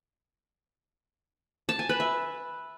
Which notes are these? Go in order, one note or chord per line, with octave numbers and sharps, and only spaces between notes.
A5
G#5
B4
E5